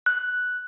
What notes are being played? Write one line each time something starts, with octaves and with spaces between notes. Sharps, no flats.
F#6